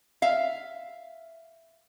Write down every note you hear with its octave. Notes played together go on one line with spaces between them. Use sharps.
E5 F5